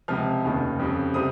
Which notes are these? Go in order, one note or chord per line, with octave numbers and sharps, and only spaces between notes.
C#2 C3 F3 F6
F1 D#2 C#3
F2 C#3 G3
C3 G3 C4 D#6